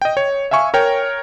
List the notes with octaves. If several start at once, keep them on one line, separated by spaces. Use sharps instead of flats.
D#5 G5
C#5
E5 F5 G#5 C#6
A#4 C#5 G5